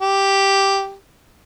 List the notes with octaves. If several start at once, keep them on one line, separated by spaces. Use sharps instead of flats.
G4